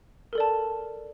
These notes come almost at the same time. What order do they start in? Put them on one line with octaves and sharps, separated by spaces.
A#4 A4 D5 A5